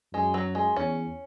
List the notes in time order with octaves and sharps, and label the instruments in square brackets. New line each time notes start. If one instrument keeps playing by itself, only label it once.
[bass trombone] F#2 [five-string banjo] G#3
[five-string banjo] F#3
G#3
[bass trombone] E2 [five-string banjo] C#4